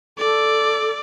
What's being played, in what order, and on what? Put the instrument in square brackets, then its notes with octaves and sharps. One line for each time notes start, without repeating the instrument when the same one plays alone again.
[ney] A4 [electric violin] D5